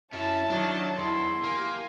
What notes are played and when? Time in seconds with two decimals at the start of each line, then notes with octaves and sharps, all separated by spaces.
0.13 F#2 C#4 E4 C#5 A5
0.50 D#3 F#3 D4
0.98 E2 E4 C6
1.43 A#3 G4 G#5